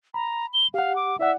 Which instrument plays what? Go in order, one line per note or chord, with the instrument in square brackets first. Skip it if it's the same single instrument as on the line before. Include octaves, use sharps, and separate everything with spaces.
[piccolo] A#5 [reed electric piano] B5
[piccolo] G7
[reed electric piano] G4 F#5 [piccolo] F5
[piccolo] D6
[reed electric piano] E4 D5 F#5 [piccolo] E5